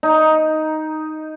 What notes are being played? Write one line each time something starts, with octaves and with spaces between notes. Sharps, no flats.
D#4